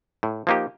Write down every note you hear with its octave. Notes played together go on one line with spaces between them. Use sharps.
A2
F3 A#3 D#4 G4